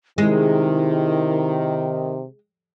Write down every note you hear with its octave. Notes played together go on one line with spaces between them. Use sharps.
C3 D#3 G#3 E4